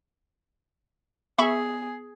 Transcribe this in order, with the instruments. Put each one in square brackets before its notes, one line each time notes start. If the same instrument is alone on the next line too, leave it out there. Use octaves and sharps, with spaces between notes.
[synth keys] B3 [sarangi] G#4 [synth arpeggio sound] E5 B5 C#6